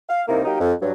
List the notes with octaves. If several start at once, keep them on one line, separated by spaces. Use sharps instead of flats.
F5
C2 C3 A#3 D#4 E4 A#4
F#3 A#3 D#4 G4 A#4 D#5
F2
G2 F#3